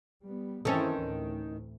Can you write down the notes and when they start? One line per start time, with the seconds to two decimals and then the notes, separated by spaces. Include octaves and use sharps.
0.24 G3 B3
0.65 G2 D#3 E3 C4 C#4 E4 A4
0.97 D2 A2